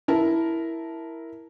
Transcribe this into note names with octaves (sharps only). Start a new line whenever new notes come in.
E4 A#4 A5